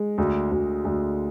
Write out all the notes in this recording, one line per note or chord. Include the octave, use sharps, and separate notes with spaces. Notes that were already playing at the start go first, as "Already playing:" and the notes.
Already playing: G#3
D2
D2
D2